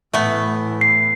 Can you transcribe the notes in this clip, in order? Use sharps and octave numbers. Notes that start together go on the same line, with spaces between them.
A2 E3 A3 B3
C7